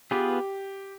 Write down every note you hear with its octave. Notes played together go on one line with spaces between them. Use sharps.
B3 F4 G4 G#4 B4